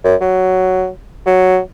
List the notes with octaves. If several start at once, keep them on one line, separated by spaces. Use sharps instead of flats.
F#2
F#3
F#3